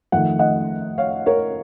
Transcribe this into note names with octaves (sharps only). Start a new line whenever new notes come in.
F2 D#3 A3 F#5
D#5 F#5
C#5 F5
A#4 C#5